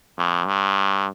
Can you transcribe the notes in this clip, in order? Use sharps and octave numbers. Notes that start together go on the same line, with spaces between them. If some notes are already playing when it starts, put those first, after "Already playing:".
F2
G2